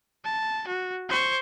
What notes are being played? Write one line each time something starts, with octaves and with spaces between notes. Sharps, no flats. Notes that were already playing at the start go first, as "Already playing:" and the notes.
A5
F#4
C5 C#6